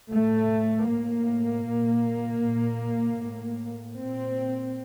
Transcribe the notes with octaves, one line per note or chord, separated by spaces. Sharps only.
A2 A3
A2 A#3
A#2
A#2
A2
A#2 C4